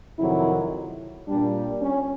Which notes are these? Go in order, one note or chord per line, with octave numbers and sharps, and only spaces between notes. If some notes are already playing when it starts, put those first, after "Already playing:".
F2 C3 D#3 F#3 E4
A#2 G3 D4
C#4